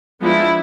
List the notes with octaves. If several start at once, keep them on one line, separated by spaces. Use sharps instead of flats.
F3 G#3 B3 D4 E4